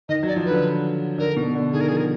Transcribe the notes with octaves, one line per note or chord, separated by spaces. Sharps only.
D#3 D#5
F#3
D5
F3
D3 B4
D3 A#4
B2
D3
D#3 G#4
A#4
F3 G#4
A#4